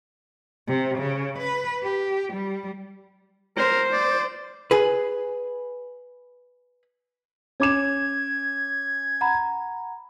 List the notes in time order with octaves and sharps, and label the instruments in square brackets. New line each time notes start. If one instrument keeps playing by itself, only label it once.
[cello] C3
C#3
B4
G4
G3
[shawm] A#4 [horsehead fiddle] C5
[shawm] D5
[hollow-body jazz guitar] G#4 B4
[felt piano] C#4 D6 E7 [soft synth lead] G#6
[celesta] F#5 A#5 B5